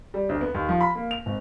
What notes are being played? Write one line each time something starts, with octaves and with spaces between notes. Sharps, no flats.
G3
D2
B3
D#2
F3
B5
A#3
F7
G#1